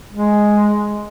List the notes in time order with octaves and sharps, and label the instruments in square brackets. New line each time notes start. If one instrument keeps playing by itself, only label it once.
[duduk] G#3